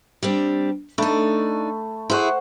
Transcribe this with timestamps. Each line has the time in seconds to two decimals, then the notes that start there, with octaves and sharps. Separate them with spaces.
0.23 G3 C4 D4
0.98 A3 D4 D#4 B5
2.10 E4 G#4 C5 F#5 C#6